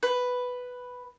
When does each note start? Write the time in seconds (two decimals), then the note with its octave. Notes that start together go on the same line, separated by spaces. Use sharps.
0.03 B4